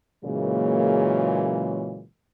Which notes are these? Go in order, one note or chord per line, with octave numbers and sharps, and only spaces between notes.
A#2 C#3 E3 F#3 G#3 A#3